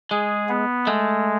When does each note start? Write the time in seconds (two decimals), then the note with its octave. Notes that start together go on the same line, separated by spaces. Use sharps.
0.11 G#3 G#4
0.49 B3
0.87 G#3 A3